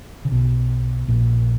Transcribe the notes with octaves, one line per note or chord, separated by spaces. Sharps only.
C#3
B1 B2
A#1 A#2